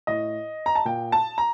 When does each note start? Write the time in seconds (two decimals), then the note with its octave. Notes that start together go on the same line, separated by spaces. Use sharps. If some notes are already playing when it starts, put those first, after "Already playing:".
0.07 A2 D#5
0.66 A#5
0.75 A5
0.85 A#2 G5
1.12 A5
1.38 A#5